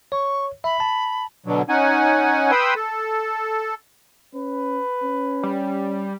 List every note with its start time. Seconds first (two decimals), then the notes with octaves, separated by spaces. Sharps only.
0.12 C#5 C#6
0.64 E5 B5
0.80 A5
1.46 B2 D3 F#3
1.69 C#4 D#4 F#5 G#5
2.51 B4 G5 B5 C6 D#6 E6
2.76 A4
4.35 C#4 B4
5.04 C#4
5.43 G3